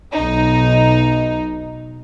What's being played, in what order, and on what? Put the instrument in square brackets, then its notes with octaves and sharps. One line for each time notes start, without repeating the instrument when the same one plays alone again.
[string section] B1 D#4